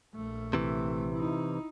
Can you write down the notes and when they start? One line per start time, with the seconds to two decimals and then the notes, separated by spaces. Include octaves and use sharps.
0.15 A#1 A3
0.53 C3 E3
1.14 D#4 E4